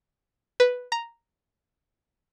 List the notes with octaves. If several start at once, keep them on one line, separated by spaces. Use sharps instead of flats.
B4
A#5